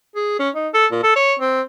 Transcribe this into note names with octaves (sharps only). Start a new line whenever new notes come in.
G#4
C#4
D#4
A4
A#2
A4
C#5
C4